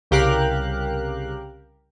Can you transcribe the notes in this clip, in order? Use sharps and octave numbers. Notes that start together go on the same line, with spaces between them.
C2 C#3 G4 A#4 F5 F#6